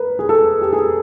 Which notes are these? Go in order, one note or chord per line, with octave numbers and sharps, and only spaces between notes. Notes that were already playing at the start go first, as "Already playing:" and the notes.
Already playing: A#4 B4
G#4
A4
G4
G#4